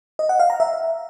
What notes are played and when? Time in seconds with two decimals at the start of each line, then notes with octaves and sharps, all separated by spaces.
0.19 D#5
0.29 F#5
0.39 F5
0.50 A#5
0.60 E5